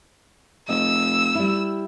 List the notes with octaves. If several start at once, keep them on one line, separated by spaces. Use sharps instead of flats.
F1 D#5 E6
G3 E4